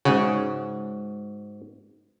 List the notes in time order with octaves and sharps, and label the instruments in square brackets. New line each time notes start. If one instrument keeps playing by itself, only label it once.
[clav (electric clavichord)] G#2 F#4 [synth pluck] C#3